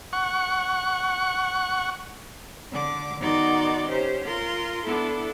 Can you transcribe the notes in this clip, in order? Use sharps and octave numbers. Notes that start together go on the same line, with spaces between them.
F#5 C#6
D3 D6
D#3 B3 D#4 F#4 D5 C6
C#4 G4 C5
F4 A#4 C6
B3 D4 E4 A4